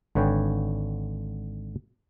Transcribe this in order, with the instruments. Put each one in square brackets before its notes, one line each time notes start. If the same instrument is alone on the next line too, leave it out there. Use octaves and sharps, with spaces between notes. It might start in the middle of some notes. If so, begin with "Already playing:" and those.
[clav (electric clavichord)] G#1 D3 B4 C#5 G5 G#5